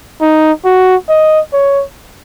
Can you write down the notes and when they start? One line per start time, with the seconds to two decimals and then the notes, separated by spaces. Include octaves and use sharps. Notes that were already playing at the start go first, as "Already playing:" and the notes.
0.21 D#4
0.65 F#4
1.09 D#5
1.53 C#5